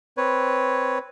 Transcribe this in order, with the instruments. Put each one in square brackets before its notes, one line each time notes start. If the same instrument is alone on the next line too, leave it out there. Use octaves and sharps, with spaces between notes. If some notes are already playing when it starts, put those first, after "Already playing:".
[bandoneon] C4 B4 C#5